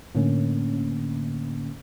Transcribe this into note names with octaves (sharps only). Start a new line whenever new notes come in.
A2 D3 A#3 C#4